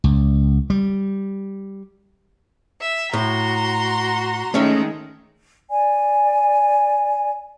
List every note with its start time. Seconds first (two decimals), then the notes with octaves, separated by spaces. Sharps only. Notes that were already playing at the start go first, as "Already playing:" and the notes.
0.04 C#2
0.70 G3
2.81 E5
3.13 A2 F#4 A#5 C6
4.54 D#3 G#3 A3 C#4 E5
5.70 D5 G#5